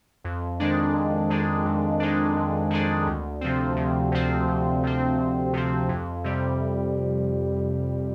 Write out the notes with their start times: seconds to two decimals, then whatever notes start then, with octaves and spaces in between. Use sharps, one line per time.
0.24 F2
0.60 D#3 G#3 D4
0.94 F2
1.30 D#3 G#3 D4
1.66 F2
2.00 D#3 G#3 D4
2.36 F2
2.70 D#3 G#3 D4
3.07 D2
3.41 C3 F3 C4
3.76 D2
4.12 C3 F3 C4
4.48 D2
4.83 C3 F3 C4
5.18 D2
5.53 C3 F3 C4
5.89 F2
6.24 C3 G3